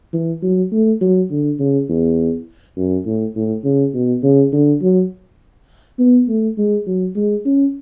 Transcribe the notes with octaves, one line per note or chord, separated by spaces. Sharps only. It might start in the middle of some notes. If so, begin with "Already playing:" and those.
E3
F#3
A3
F#3
D3
C#3
E2
F#2
A2
A2
C#3
B2
C#3
D3
F#3
B3
A3
G#3
F#3
G#3
C#4